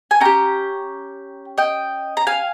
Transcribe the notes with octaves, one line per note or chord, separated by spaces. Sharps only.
G#5
C#4 G4 G5 A#5
D#5 G5
A#5
F5 G#5